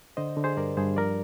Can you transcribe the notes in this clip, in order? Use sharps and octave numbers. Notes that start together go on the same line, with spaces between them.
D3 C5 D#5
D3
G#4 C5
G2 A#4 D5
G2 G#4 C5
F3 A#4 D5